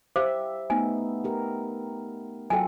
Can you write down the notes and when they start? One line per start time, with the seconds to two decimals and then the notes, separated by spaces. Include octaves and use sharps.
0.16 G4 C5 E5 F5 D6
0.70 A3 B3 D#4 G#5
1.24 G4 A#4
2.50 F#3 F4 A4 G5 G#5